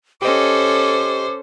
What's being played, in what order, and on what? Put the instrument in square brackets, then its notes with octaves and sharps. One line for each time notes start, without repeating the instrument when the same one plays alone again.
[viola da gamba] C#4 A4 [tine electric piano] G4 D#5 [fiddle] C5 [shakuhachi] D6